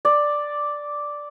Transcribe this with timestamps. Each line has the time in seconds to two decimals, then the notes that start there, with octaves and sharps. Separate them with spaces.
0.05 D5